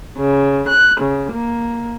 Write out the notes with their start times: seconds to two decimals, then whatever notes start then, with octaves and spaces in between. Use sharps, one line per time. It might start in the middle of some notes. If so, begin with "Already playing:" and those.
0.18 C#3
0.69 F#6
1.00 C#3
1.33 A#3